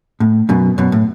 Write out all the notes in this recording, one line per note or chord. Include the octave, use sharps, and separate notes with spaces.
A2
F#2 B2
F#2 B2
A2